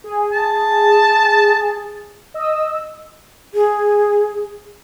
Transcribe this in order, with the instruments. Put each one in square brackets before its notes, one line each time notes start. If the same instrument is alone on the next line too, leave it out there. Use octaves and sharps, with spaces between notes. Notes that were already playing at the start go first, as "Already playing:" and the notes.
[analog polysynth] G#4
[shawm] A5
[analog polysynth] D#5 E6
[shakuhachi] G#4